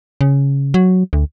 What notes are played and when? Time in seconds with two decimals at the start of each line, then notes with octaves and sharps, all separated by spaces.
0.21 C#3
0.74 F#3
1.13 D2